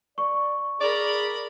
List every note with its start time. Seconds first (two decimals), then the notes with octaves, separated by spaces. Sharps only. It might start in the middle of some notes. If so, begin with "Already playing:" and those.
0.18 D5 C#6
0.81 G#4 A#4 D5 B5